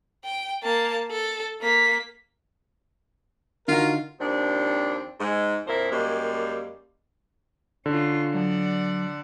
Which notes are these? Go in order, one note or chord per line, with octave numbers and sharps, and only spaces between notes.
G5
A#3 A5
A4
A#3 B6
D3 D#4 F4 F#4 A#4
D#2 F3 C4 D4
G#2 G#3
F2 A#2 E4 A#4 C5
F#2 G3 G#3 A#3
D3 C#4 F4
F#3 D5 F#5 A5